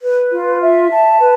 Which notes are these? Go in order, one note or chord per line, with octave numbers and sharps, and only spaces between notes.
B4
F4
E5
A5
B4